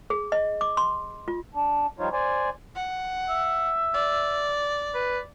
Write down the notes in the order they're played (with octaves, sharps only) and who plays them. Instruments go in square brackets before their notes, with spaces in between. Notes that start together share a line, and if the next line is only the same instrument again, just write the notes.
[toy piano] G#4
D#5
D6
C6
F4
[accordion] D4
F3 G3 D#4 F4 C#5
C5 D5 G#5
[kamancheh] F#5
[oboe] E5
[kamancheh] D5
[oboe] B4